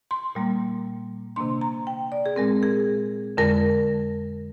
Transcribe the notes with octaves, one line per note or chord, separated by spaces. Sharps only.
C6
A#2 G3 A#3
C3 D#3 A#3 D4 C6
A#5
G5
D5
G#4
A#2 G#3 C4 A#4
G#4
F2 D3 G#3 A#4